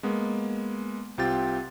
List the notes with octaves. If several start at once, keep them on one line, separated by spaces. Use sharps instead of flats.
G#3 A#3 B3
C2 C4 F4 G4 G5 A6